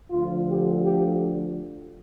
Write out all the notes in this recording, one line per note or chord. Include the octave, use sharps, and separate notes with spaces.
D2 D3 F3 F4
G4
G4